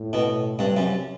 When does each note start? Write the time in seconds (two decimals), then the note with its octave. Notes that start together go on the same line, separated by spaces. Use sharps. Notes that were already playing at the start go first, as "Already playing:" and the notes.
Already playing: A2
0.13 B2
0.59 G2 C3
0.77 F#2